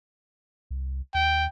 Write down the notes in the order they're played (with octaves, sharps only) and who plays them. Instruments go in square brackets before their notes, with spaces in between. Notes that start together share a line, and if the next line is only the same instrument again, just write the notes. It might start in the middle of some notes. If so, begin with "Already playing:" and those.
[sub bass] C2
[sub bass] D#2 [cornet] G5